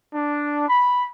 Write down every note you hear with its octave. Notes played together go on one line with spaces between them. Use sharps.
D4
B5